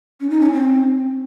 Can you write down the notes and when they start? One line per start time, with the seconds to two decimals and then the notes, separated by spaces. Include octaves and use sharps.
0.21 C#4
0.30 D#4
0.40 C#4
0.53 C4